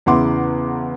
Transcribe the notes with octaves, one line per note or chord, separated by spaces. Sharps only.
E2 C#3 E4 F#5 C6 D6